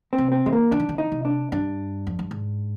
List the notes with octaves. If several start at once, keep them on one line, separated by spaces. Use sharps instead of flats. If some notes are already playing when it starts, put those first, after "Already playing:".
C4
C3
C4
D#3 G#3
A#3
D3 D4
D#3
D3
D#4
C3
D4
G2 D4
F2
G2
G#2